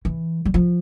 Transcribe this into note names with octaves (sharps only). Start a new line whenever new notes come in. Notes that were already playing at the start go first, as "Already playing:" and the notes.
E3
G3
F3